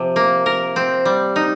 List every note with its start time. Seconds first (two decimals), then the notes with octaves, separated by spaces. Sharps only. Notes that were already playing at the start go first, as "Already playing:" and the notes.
Already playing: C3 F3
0.16 A#3
0.46 A#4
0.76 C4
1.05 G3
1.36 D#4